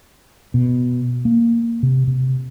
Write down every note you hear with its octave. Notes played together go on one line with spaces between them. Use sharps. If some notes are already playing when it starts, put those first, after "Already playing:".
B2
A#3
C3
C3